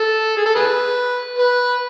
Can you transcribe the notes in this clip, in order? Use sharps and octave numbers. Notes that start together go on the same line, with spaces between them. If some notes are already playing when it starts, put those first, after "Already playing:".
Already playing: A4
G#4
A4
G#4 B4
B4